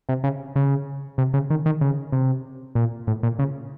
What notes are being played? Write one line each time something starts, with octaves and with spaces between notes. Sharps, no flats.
C3
C#3
C#3
C3
C#3
D#3
D#3
C#3
C3
A#2
A2
A#2
C#3